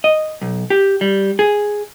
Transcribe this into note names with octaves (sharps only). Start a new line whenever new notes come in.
D#5
B1
G4
G3
G#4